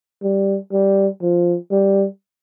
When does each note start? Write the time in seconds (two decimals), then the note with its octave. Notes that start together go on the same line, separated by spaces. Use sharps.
0.23 G3
0.72 G3
1.22 F3
1.71 G3